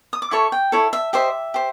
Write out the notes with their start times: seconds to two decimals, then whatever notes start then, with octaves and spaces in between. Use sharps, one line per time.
0.13 D#6
0.22 D6
0.31 E4 A4 C#5 C#6
0.52 G5
0.72 E4 A4 C#5
0.93 E5
1.13 G4 C5 D#5 E5
1.54 G4 C5